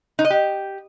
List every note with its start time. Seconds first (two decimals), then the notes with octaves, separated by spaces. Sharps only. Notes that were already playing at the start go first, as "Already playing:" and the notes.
0.19 D#4
0.25 D#5
0.30 G4